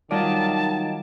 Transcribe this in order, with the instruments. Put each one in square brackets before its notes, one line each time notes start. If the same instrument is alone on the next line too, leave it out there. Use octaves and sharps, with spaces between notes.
[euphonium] D#3 [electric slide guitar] F#3 F4 D5 [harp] G3 D#5 [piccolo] A5